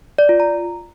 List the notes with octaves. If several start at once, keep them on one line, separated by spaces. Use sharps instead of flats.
D5
F4
A#5